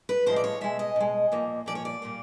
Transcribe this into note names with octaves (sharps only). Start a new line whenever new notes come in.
B4
A2 F3 G#3 C5
D5
C#5
B2 G#3 E5
D#5
B2 G#3
A#2 F3 A#3
A#2 F3 A#3 D5
C#5
D5
A#2 G3 A#3